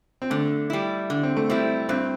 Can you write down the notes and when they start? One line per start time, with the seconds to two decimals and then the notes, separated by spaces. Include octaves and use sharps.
0.22 C4
0.30 D3 A3
0.70 G3 E4
1.10 D3
1.23 C4
1.37 A3
1.49 G3 C4 E4
1.89 G2 C4